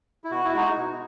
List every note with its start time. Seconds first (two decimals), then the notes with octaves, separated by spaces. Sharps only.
0.24 E4
0.31 B2 F#4
0.44 E4
0.53 G#3 D#4 F#4
0.76 B2